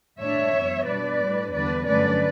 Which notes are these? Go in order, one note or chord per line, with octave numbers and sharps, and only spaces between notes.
A2 G3 D4 C#5 E5
F#2 E3 B3
B2 G3 D4 B4 D5
A2 G3 D4
E2 D3 G3 D4 B4 D5
G2 D3 F#3 A3 C#4 B4 D5